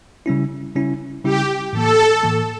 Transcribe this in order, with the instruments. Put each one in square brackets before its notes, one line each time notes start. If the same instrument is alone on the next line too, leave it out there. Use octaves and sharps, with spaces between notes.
[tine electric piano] C#3 G3 C#4 E4
C#3 G3 C#4 E4
[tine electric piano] C#3 G3 C#4 E4 [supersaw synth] G4
[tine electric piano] A2 E3 A#3 [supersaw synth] A4
[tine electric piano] A2 E3 A#3